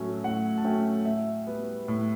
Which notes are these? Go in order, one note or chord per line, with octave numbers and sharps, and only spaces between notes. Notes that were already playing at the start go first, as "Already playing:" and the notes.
Already playing: A2 F#3 A3 C#4
A2 F#5
A5
F#3 A3 C#4 G5
A2 E5
G3 B3
A2